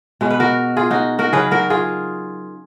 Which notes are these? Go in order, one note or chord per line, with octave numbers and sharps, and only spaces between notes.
B2 G#3 C#4
B4
F#4 A#4
F4 G#4
D#4 F#4
F#4 A#4
C#3 F#3 C#4 G#4 B4
F#4 A#4
F4 G#4